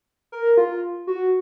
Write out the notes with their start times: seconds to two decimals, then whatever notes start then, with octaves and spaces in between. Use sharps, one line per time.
0.32 A#4
0.57 F4
1.07 F#4